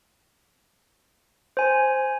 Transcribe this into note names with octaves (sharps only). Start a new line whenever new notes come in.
C5 G#5